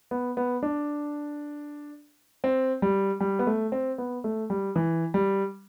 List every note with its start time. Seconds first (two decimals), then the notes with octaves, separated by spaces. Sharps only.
0.11 B3
0.37 B3
0.63 D4
2.44 C4
2.82 G3
3.20 G3
3.39 B3
3.47 A3
3.72 C4
3.98 B3
4.24 A3
4.50 G3
4.76 E3
5.14 G3